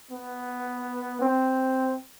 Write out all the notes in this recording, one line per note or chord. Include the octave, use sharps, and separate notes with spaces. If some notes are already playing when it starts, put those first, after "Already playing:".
B3
C4